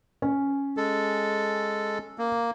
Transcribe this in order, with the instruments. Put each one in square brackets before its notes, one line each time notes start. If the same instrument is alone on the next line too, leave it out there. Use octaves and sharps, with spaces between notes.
[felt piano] C#4
[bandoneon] G#3 A4
A#3